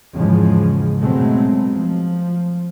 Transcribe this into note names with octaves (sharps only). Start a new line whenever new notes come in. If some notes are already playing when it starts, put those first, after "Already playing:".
E2 G#2 C#3 F3 G#3
B2 F#3 G#3 A3 C4
F3